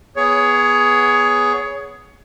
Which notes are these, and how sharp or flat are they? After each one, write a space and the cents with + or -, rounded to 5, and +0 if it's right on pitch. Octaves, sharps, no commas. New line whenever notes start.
B3 +0 G#4 +0 C#5 +20